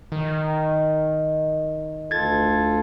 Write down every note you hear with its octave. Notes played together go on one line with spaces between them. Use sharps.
D#3
D2 F4 A4 G#6 A6